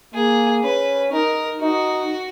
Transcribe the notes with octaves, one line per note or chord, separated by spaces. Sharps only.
A#3 G#4
C#4 B4
D#4 A#4
D#4 F#4